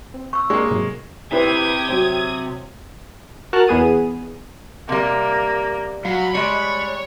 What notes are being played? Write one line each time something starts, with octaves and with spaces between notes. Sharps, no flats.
C4
C#6 E6
G#3 A#3 C4 D4 C#6
G#2 C3 F#3
C3 E4 G4 B4 C5 D#6 G#6
F#3 C4 C5
F#4 A#4 A5 F6 F#6
E2 B3 G#4 D#7
C3 G3 A#3
F#3 F5 B5
G3 G#3 C#5